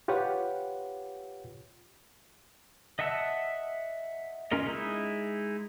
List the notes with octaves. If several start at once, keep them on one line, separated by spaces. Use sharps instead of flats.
F4 G4 B4 C#5 F#5
D#5 E5 F#5 A5 E6
C#4 F4 A#4 D#5
G#3 D#4 E4